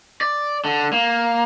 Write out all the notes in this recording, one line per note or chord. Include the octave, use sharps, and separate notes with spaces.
D5
D3
A#3